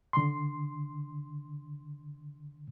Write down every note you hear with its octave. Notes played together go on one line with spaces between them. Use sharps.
D3 C6